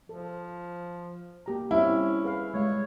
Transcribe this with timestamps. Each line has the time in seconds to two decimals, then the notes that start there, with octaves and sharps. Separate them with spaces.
0.09 F3 A4
1.46 A#3 G4 A#5
1.71 G3 C4 C#4 E4 G4
2.24 G#4 B4 F5
2.54 G3 G#3 C#5 F5